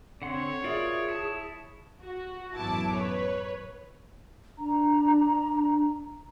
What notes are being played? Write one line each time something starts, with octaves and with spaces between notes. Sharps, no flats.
D3 C4 C#5 F#5 C6
F4 F#4 G#4 A#4 D5 E5
E4 A5
F#4
A1 F#2 B3 E4 A5 D6
B4 C#5
D4 A#5